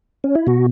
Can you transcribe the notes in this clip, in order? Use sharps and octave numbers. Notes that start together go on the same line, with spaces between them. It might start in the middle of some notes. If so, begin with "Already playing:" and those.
C#4
E4
B2 F#4